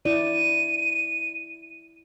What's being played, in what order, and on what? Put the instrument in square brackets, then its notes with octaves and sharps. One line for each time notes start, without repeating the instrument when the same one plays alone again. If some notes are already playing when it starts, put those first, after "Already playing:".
[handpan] E4 D5 [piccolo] D#7